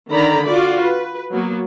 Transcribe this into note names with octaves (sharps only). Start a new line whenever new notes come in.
D3 D#3 D5 A#5 B5
F4 F#4 D5
B4
F#3 A#3 B3